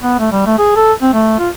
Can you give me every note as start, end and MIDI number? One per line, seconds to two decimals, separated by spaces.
0.03 0.19 59
0.19 0.29 57
0.32 0.44 55
0.46 0.57 57
0.58 0.76 68
0.76 0.93 69
1.02 1.13 60
1.13 1.38 57
1.39 1.49 65